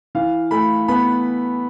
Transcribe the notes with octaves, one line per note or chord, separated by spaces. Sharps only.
E3 F5
A3 B5
B3 B5